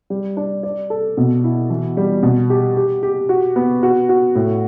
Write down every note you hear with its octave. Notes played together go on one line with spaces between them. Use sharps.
G3
D4
D5
A4
B2
E4
E3
G3
B2
G4
G4
G4
F#4
B3
F#4
F#4
A2